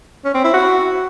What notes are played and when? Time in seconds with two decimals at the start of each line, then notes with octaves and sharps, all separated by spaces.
0.24 C#4
0.34 C4
0.44 E4
0.54 F#4